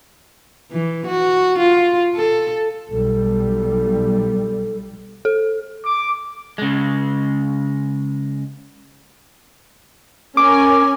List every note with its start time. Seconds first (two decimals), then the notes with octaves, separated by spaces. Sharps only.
0.72 E3
1.07 F#4
1.59 F4
2.16 A4
2.90 B1 B2 G3 A4
5.25 A4
5.84 D6
6.58 C#3 G#3
10.37 C#4 A#4 G#5 D6